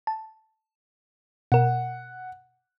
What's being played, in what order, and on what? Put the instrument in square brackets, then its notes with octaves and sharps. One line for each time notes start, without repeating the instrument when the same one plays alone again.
[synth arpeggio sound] A5
[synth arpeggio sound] B2 A#4 [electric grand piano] F#5